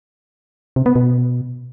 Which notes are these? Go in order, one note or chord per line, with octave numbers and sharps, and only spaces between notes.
C3
B3
B2